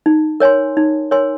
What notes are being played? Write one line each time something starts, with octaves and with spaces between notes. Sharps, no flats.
D#4
A#4 C#5 G#5 C6
D#4
A#4 C#5 G#5 C6